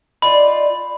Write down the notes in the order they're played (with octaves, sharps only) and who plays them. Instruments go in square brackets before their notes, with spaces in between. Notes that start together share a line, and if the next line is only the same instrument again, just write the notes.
[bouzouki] D#4 F4 D5 [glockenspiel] B5